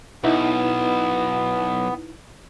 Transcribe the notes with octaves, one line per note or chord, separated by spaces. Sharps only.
B1 B3 D#4 E4 B4